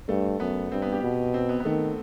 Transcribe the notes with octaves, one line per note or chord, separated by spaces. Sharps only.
G2 A3
F#2 B3
G2 C4
B3
G4
B2
C4
B3
B3
D#3 A3